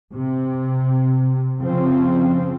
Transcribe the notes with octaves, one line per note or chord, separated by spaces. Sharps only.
C3
C#3 F3 C4